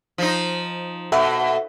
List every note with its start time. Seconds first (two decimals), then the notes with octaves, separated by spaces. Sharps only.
0.18 F3 D#4
1.12 B2 A4 E5 F#5